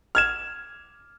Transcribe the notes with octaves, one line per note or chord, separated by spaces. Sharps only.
F6 G#6 E7